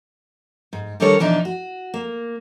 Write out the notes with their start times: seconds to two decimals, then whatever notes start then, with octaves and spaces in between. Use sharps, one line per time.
0.73 G#2
1.00 D#3 G3 D4 A4 A#4 C#5
1.19 B2 E3 F3 D4 D#4
1.45 F#4
1.94 A#3